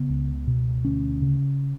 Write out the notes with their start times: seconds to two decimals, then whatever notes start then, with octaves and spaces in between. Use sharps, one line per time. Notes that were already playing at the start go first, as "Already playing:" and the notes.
Already playing: C#3 B3
0.09 C#2
0.47 B2
0.85 D2 C#4
1.22 C#3